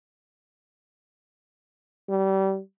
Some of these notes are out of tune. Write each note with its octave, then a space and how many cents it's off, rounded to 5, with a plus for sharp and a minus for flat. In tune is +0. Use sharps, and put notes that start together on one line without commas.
G3 -25